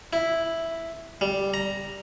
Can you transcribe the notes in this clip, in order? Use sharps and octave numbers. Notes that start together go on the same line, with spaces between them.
E4
G3
A#5